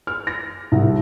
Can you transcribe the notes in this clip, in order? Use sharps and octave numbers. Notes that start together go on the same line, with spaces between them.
F6
A#6
C2